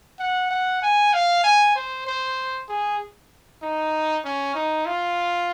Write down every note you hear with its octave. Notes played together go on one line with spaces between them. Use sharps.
F#5
F#5
G#5
F5
G#5
C5
C5
G#4
D#4
C#4
D#4
F4